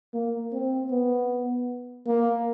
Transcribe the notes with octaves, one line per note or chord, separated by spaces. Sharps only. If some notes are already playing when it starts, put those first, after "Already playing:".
A#3
C4
B3
A#3